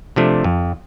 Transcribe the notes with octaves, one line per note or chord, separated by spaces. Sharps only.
C3 F3 A3 D4
F2